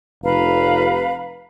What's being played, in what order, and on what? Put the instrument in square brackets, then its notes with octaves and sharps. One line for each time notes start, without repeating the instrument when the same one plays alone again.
[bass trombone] F1 [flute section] B4 F5 A#5